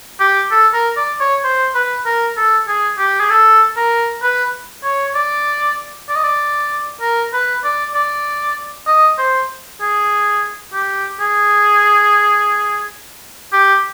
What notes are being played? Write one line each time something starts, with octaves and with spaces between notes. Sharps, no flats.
G4
A4
A#4
D5
C#5
C5
B4
A#4
A4
G#4
G4
G#4
A4
A#4
B4
C#5
D5
D5
D#5
D5
A#4
B4
D5
D5
D#5
C5
G#4
G4
G#4
G4